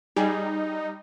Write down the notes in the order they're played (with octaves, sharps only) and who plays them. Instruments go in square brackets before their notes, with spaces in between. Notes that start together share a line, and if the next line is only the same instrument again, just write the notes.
[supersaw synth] G3 [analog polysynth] D#4 [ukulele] G#4